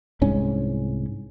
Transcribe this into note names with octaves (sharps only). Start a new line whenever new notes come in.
C2 G#2 C#4